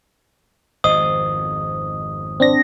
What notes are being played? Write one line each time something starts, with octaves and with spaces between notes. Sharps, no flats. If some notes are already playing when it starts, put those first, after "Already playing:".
G#1 F2 C5 D#5 D#6
C4 D4 A#6